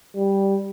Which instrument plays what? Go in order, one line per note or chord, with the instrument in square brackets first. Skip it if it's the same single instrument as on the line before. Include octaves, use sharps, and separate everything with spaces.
[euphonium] G3